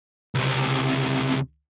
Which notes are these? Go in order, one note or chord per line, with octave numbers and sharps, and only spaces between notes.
C#2 C3